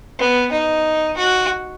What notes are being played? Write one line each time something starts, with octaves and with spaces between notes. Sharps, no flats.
B3
D#4
F#4